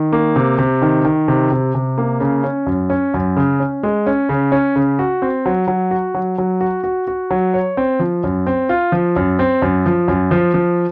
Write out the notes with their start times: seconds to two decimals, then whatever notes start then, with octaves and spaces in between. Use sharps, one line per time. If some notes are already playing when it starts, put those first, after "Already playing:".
Already playing: D#3
0.12 A#3
0.36 C3
0.59 C3
0.82 D#3
1.05 D#3
1.28 C3
1.52 C3
1.75 C3
1.98 A#3
2.20 C#3
2.44 C#4
2.67 F#2
2.90 C#4
3.14 F#2
3.36 C#3
3.60 C#4
3.83 G#3
4.06 C#4
4.29 C#3
4.52 C#4
4.76 C#3
4.99 F#4
5.22 C4
5.46 F#3
5.68 F#3
5.91 F#4
6.14 F#3
6.38 F#3
6.61 F#4
6.84 F#4
7.08 F#4
7.31 F#3
7.54 C#5
7.77 C4
8.00 F3
8.24 F#2
8.47 C4
8.69 F4
8.92 F3
9.16 F#2
9.39 C4
9.62 F#2
9.86 F3
10.08 F#2
10.31 F3
10.54 F3